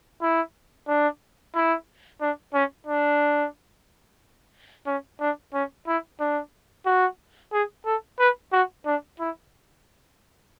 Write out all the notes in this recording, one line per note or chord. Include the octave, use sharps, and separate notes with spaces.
E4
D4
E4
D4
C#4
D4
C#4
D4
C#4
E4
D4
F#4
G#4
A4
B4
F#4
D4
E4